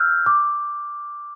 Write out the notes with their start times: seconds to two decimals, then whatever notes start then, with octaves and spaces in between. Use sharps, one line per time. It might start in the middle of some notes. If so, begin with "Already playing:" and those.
Already playing: E6 F6 G6
0.26 D6